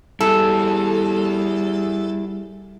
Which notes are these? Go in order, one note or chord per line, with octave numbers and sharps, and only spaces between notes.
G3 E4 G#4 A4